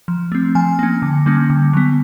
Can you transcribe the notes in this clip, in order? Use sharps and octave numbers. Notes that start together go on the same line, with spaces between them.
F3
A3 C4
F3 G#5
A#3 C#4
D3
G3 A#3 C#4
D3
F#3 B3